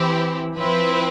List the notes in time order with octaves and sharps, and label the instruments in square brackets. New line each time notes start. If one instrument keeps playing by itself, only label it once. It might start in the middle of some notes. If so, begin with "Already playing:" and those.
Already playing: [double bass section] E3 [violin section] C4 E4 G4
[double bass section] F3 [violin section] C4 E4 B4